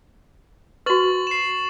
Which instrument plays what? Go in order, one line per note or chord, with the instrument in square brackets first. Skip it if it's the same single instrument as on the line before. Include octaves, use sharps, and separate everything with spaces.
[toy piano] F#4 B4 [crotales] C#6 A6 F#7
[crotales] C7 E7